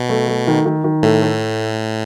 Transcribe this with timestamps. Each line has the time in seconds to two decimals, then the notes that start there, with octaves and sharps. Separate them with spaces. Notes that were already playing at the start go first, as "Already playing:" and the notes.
Already playing: B2
0.10 A3
0.28 A3
0.47 D#3
0.66 D#3
0.84 D#3
1.03 A2 A3
1.22 A3